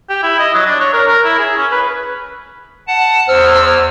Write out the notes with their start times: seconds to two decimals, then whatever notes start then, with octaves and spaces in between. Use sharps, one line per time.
0.09 G4
0.23 E4
0.39 D#5
0.54 F#3
0.67 D4
0.80 C#5
0.93 A#4
1.08 A#4
1.24 E4
1.38 G#4
1.57 C#4
1.71 B4
2.88 F#5 A5
3.28 E2 C5 E6 F6